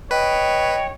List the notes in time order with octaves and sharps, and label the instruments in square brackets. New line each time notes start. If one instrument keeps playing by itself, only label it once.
[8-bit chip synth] B4 [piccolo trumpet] C#5 [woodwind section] D#5 [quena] G5